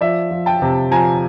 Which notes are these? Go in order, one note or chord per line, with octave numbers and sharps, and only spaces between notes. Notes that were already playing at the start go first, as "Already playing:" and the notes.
F3 D5 E5
F3
G5 A5
C3
F3 G#5 A#5